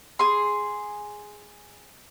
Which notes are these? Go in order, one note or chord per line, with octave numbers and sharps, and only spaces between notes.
G#4 C6